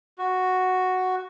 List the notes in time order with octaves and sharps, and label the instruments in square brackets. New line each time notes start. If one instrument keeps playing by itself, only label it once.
[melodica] F#4